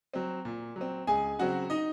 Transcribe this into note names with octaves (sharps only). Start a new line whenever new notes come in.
F#3 C4
A#2
F#3
C4
C#2 G#4 G#5
C#3 F#3 C4 F#4 F#5
D#4 D#5